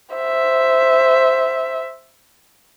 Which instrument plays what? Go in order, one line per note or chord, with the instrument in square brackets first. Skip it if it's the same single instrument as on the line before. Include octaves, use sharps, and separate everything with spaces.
[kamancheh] C5 E5